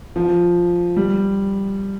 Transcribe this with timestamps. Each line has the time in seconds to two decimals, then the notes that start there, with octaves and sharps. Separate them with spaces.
0.16 F3
0.96 G3